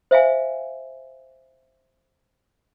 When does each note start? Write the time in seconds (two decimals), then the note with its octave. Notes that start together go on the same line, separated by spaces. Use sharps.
0.11 C5 E5 F5 G#5